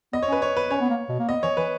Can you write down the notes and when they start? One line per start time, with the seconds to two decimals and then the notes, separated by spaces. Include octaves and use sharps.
0.13 B3 D#5
0.23 C#5
0.28 C#4 B4
0.42 C#5
0.57 B4
0.71 C#4 C#5
0.81 B3
0.90 A#3
1.09 B2
1.19 A#3
1.29 B3 D#5
1.43 E3 C#5
1.57 E3 B4